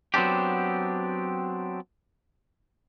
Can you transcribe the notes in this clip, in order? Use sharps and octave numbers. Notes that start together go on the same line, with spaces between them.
F#3 B3 C4 D4 G4